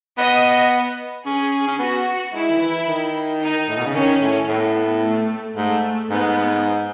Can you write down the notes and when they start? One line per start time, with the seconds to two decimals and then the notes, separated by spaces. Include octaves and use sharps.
0.18 B3 D#5
1.26 C#4 G#4
1.68 C#4
1.79 B3 F#4
2.33 G#3 E4
2.50 D#3
2.60 E3
2.87 D#3
3.42 D#4
3.69 A2
3.78 B2
3.86 C#3
3.95 D#3 C#4
4.22 A2
4.48 A2 B3
5.02 A3
5.56 G#2 A3
6.10 G#2 B3